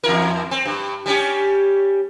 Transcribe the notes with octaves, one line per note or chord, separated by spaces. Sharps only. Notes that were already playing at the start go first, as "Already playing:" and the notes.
E2 E4 A#4
C4
G2
G3 C#4 G4